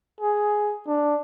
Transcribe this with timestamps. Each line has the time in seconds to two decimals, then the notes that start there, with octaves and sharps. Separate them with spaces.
0.21 G#4
0.88 D4